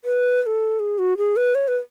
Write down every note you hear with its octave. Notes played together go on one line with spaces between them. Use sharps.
B4
B4
A4
G#4
F#4
G#4
B4
C#5
B4